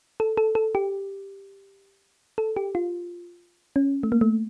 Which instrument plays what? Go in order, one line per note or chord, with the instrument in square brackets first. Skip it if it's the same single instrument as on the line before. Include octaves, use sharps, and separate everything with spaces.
[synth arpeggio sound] A4
A4
A4
G4
A4
G4
F4
C#4
A3
A#3
A3